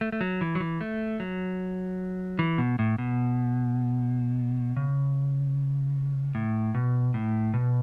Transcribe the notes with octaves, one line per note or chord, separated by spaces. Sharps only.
A3
A3
F#3
E3
F#3
E3
A3
F#3
E3
B2
A2
B2
C#3
A2
B2
A2
B2